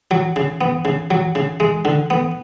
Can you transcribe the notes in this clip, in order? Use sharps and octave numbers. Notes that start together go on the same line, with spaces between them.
F#3
C#3
B3
C#3
F#3
C#3
G#3
D3
B3